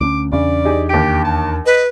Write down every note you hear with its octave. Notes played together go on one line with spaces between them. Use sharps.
D2 C4 C#4 D6
E2 C#3 D4 D5
D#4 G4 G#4
D#2 G4 D7
A5
B4 D#5